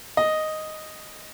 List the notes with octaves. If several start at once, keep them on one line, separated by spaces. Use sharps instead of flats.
D#5